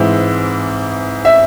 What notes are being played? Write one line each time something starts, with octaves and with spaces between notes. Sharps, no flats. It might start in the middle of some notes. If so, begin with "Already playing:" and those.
Already playing: G#2 E3 G#3 C4 E4
E5